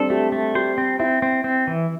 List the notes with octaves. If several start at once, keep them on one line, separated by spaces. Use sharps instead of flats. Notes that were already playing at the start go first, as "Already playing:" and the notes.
Already playing: G3 C4 D4 A4
A3 G4
A3
G4 C5
C4
C4 E4
C4
C4
E3